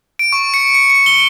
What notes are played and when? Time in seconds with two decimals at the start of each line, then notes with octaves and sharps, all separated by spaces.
0.19 D7
0.33 C#6
0.54 C#7
0.74 C#7
0.90 C#7
1.06 G7